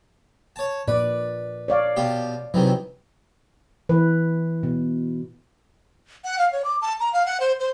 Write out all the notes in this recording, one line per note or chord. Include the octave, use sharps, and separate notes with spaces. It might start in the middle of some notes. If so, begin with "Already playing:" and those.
C#5 A5
A#2 B4 D5
C#5 D5 F5
B2 F4 G4
C3 D#3 E3 F#3
E3 B4
B2
F#5
F5
C#5
D6
A5
A#5
F5
F#5
C5
C5